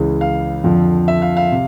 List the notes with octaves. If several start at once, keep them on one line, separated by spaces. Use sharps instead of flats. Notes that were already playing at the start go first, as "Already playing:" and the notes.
Already playing: C#2 C#3 E3
F5
F2 D3 F3
E5
F5
F5
C3